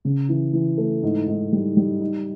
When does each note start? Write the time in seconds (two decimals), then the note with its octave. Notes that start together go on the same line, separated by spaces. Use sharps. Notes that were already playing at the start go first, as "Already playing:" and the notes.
0.05 C#3
0.29 E3
0.53 E3
0.78 A3
1.03 G#2
1.28 G#2
1.52 G3
1.77 G3
2.01 D#4